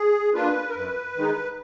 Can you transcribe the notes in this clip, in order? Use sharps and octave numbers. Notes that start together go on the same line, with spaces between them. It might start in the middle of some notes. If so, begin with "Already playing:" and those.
Already playing: G#4
A#3 D4 F4 B4
A#4
F#2 B4
D#3 G#3 D#4